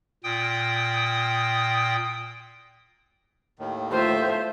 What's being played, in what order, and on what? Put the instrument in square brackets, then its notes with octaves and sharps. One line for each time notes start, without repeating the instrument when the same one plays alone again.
[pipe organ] A#2 G5 D#6
[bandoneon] D#2 A2 D#3
[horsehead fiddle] A3 C5 [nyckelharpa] F4 E5